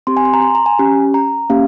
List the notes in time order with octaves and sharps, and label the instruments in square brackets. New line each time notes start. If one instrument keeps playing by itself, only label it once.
[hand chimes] C4 G4 C6
G#5
C6
A#5
C6
A#5
G#5
C#4 G4
A#5
A#3 C#4 G4 F5